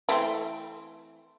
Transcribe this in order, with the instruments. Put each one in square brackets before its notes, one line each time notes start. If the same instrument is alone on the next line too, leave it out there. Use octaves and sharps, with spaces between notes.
[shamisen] E3 A3 C4